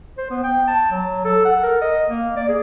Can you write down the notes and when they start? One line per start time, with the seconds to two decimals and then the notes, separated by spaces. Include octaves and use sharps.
0.18 C5
0.31 B3
0.43 G5
0.67 A5
0.91 F#3
1.25 A4
1.45 F#5
1.63 A#4
1.82 D#5
2.09 A#3
2.36 D5
2.49 G#4